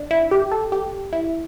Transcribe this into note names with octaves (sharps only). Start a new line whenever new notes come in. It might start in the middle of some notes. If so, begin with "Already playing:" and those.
Already playing: D4
E4
G4
A4
G4
E4